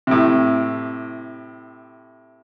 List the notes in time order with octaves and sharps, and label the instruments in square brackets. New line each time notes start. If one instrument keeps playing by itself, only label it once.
[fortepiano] A2 C3